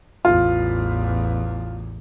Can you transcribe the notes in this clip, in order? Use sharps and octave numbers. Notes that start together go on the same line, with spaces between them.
A1 E2 F4